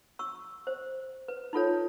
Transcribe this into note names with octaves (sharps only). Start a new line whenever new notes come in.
C#6 E6
C5
B4
D#4 F4 A4 C#5